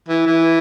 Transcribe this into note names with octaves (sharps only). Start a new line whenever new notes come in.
E3
E3